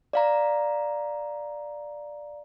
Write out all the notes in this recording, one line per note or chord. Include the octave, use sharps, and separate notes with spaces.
D5 F5 A#5